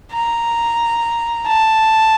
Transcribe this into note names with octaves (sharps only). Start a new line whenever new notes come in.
A#5
A5